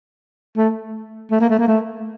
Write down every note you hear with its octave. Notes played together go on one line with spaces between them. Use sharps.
A3
A3
A#3
A3
A#3
A3